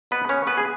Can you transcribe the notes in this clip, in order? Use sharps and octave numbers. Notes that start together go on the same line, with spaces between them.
B2 B3 B4
C#4 C#5
A3
B3 B4
G#4